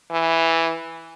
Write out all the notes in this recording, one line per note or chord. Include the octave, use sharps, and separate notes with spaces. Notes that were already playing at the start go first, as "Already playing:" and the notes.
E3